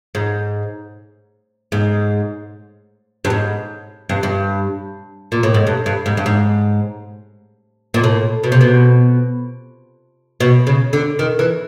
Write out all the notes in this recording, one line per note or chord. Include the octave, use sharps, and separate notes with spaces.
G#2
G#2
G2
G#2
G2
G2
A#2
A2
G#2
G2
G2
G#2
G2
G#2
A#2
A2
B2
C3
B2
B2
C#3
D3
D#3
E3